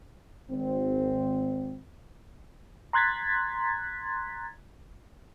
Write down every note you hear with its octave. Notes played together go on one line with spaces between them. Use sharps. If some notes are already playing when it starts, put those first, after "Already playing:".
G#1 C4
A#5 C6 F#6 G#6 A6 B6